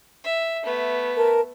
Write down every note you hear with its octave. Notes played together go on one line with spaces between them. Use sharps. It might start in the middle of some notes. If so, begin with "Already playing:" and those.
E5
A3 B3
A#4 A5